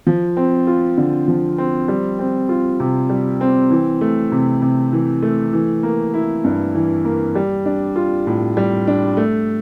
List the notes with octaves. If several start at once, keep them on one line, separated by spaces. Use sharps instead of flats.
F3
C4
F4
D3
F3
C4
G3
C4
F4
C3
G3
C4
E3
A3
C3
C3
E3
A3
E3
A#3
E4
G2
E3
A#3
G3
D4
F4
A2
G3
D4
A3